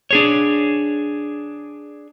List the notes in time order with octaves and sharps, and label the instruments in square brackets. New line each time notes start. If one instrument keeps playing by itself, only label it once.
[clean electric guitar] D4 G#4 C#5